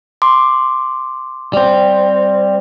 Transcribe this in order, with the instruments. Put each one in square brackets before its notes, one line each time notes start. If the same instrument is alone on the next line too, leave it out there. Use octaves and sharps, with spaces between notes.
[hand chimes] C6 D6
[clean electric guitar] G3 C4